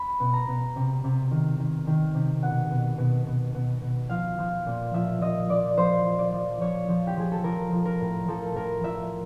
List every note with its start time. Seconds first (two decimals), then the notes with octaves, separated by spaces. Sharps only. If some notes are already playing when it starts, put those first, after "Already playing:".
Already playing: B5
0.20 B2
0.33 A#5
0.48 B2
0.76 C3
1.04 C3
1.31 D#3
1.60 D#3
1.87 D#3
2.15 C3
2.43 B2 F#5
2.71 B2
2.98 B2
3.27 B2
3.55 B2
3.82 B2
4.09 F3 F5
4.38 F3
4.66 A#2
4.94 F3 E5
5.21 F3 D#5
5.49 F3 D5
5.77 F3 C5
6.05 F3
6.19 D5
6.32 F3
6.61 F3 C#5
6.88 F3
7.07 G4
7.17 F3 G#4
7.32 A4
7.44 F3 A#4
7.72 F3
7.85 A#4
8.00 A2
8.28 F3 A4
8.55 A2 A#4
8.84 F3 E5